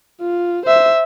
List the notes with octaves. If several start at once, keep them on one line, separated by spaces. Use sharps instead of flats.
F4
C5 E5